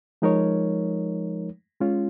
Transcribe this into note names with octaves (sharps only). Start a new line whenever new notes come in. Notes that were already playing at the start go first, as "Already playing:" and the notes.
F3 G#3 D#4 A#4 C#5
G#3 C#4 F4